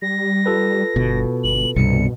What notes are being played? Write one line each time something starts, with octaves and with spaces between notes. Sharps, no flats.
G3 A#6
F4 A4 B4
G1 B2
G1 F#7
C2 G2 B2 C#7